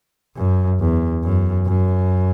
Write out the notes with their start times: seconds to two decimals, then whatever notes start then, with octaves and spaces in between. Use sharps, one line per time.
0.36 F#2
0.80 E2
1.23 F#2
1.66 F#2